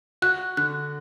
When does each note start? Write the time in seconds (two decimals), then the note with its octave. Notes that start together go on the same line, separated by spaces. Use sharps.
0.22 F#4 F#6
0.57 D3 F#6